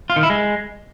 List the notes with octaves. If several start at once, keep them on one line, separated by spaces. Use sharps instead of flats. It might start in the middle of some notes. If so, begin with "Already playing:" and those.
F4
D#3
E4
G#3